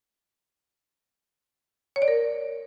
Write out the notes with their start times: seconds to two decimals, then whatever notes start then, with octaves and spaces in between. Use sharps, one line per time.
1.96 C#5
2.02 D5
2.08 A#4